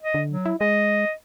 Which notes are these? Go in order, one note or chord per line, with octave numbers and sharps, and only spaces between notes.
D#5
D3
F#3
E4
G#3 D#5